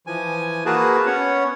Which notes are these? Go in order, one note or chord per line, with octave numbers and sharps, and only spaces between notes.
E3 F3 G#5
A#3 F#4 G#4 A#4 B4 A5
B3 C#4 C#5 F#5